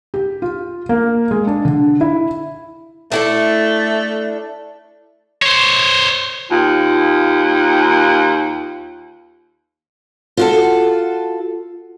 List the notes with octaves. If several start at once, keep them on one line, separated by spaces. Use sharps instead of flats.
G4
F4
A#3
G#3
D4
D3
E4
A3 D4 E4 A4
C5 C#5
D#2 F4
F4 F#4 A4